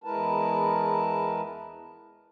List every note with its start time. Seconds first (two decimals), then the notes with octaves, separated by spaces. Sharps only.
0.04 E2 G#3 E4 A#4 B4 A5